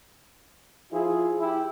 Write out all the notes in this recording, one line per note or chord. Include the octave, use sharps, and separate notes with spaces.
F3 E4 F4 G#4
E4 G4